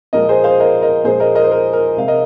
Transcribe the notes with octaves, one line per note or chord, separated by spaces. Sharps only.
A#2 F3 G#3 A#4 D#5
G#4 C5
C5 F5
A#4 D#5
A#4 D#5
A#2 F3 G#3 G#4 C5
A#4 D#5
A#4 D#5
C5
A#4
A#4
C3 G#3 F5
A#4 D#5